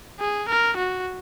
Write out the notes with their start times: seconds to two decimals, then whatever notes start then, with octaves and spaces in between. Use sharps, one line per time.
0.20 G#4
0.49 A#4
0.77 F#4